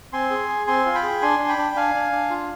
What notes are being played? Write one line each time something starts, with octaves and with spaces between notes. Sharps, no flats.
C4 G#5 C6
G#4
G#4
C4 G#5 C6
F4
G5 B5
G#4
D4 G#5 C6
D4
G5 B5
D4
D4 F5 G#5
D4
D4
F4